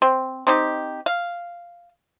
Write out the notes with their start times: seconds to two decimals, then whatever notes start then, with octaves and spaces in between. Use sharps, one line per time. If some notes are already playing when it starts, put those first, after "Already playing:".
0.02 C4
0.47 C4 D#4 G4
1.06 F5